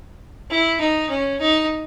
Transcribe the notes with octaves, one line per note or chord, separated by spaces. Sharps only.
E4
D#4
C#4
D#4